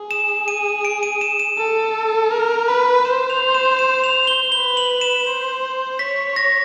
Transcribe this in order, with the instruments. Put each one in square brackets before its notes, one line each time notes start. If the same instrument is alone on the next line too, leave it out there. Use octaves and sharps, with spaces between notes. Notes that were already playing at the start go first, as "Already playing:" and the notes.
Already playing: [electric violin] G#4
[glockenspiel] E7
D#7
D7
D#7
E7
E7
[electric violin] A4
A#4
B4
[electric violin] C5 [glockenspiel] E7
[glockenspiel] F7
E7
E7
F7
G7
[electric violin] B4 [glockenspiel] G7
[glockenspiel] F#7
E7
[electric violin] C5
[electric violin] C#5 [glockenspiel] B6
[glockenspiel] A#6